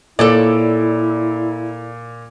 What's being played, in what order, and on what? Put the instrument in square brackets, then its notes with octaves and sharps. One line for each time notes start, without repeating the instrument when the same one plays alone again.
[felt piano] A#2 [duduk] E4 [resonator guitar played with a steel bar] A4 C#5 D5